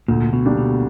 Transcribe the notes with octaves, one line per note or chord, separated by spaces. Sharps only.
D2 A#2
B2
D3 G3 A#3 D4
B2